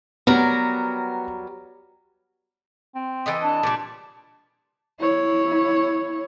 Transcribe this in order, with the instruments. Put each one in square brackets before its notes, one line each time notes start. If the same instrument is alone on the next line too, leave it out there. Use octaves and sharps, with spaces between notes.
[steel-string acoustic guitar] F#3 G3 A#4 [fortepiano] B3
[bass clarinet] C4
[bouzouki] E3 A4 D#5
[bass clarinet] D4 [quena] A5
[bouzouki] A#2 G3
[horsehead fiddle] E4 C#5